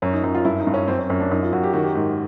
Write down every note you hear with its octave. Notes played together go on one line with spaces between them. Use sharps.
F#2 C#4
D#4
F#2 D#4
F4
G2 E4
D#4
G2
C#4
F#2 C4
C#4
F#2 C#4
D4
F#2 D#4
F4
F#2 F#4
G4
D#3 F#4
G4
G#2